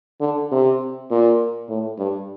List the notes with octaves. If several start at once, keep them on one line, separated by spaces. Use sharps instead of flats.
D3
C3
A#2
A2
G2